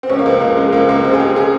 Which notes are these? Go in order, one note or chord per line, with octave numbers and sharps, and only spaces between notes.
C4
C#2 C#4
A#3
C#2 C4
C#2 A#3
C#3 G#3
C#2 A#3
C#2 A#3
C#3 C4
G#4
C#3 G4
G#4